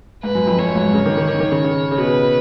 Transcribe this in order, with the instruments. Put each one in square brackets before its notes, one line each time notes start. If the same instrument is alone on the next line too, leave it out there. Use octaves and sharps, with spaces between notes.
[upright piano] G#2 [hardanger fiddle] B4
[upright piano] F#2
F2
[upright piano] F#2 [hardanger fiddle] C#5
[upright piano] G#2
C#3
D#3
D#3
D#3
D#3
C#3
C#3
C#3
[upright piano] B2 [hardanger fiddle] B4